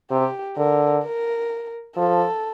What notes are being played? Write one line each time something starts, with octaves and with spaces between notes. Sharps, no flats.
C3 G4
D3 A#4
A#4
F3 A4